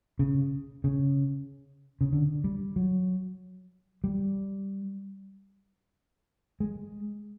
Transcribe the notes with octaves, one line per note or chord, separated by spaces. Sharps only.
C#3
C#3
C#3
D3
G3
F#3
G3
G#3